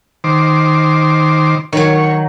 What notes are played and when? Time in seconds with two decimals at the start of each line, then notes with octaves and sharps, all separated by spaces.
0.24 D#3 C5 D6
1.73 D#3 F#3 C#5